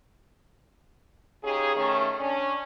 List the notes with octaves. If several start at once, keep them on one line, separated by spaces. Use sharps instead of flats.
C#3 C#4 D#4 G4 G#4
D#3 A3 C#4
C#4 D4